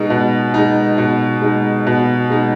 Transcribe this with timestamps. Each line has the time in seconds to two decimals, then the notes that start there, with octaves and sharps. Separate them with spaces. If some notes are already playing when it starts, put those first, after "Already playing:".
Already playing: B2 G#3 D#4
0.10 B2
0.54 G#3 D#4
0.98 B2
1.42 G#3 D#4
1.87 B2
2.30 G#3 D#4